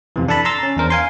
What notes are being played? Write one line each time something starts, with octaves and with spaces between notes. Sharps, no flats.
F2 C3 E3
D4 A4 A5 B5
A#5 C6 E6 A6
C#4
E2 D4 A#4 C5
F5 G#5 C6